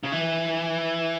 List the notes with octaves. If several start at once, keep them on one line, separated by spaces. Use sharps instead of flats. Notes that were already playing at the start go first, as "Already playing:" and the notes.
C#3
E3